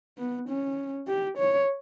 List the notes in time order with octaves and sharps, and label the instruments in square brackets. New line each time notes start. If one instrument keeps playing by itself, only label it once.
[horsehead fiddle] B3
C#4
G4
C#5